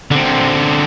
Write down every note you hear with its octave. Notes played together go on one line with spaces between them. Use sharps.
D3 C4